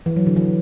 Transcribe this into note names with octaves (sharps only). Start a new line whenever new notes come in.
E3
F#3
D3
E3